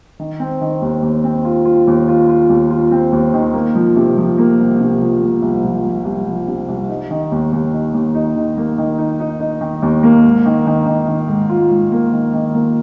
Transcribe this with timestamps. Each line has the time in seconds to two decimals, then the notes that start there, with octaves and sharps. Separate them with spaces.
0.19 D#3
0.40 C4
0.61 D#3
0.82 D#2
1.02 D#2
1.24 C4
1.45 F4
1.65 F4
1.87 D#2
2.08 F4
2.29 F4
2.49 D#2
2.70 F4
2.91 C4
3.12 D#2
3.34 D#3
3.54 A#3
3.75 F3
3.96 C3
4.17 F3
4.38 A#3
4.59 C2
4.80 C3
5.01 F3
5.22 A#3
5.42 C2
5.64 F3
5.85 F3
6.05 C2
6.26 F3
6.48 C3
6.68 C2
6.89 D#4
7.11 D#3
7.32 D#2
7.53 D#2
7.73 D#4
7.94 D#2
8.15 D#4
8.36 D#3
8.57 A#3
8.78 D#3
8.98 D#4
9.20 D#4
9.40 D#4
9.61 D#3
9.82 D#2
10.03 A#3
10.24 G#2
10.45 D#3
10.67 D#3
10.86 D#3
11.08 D#3
11.28 G#2
11.49 F4
11.70 G#2
11.92 A#3
12.13 D#3
12.33 D#3
12.54 A#3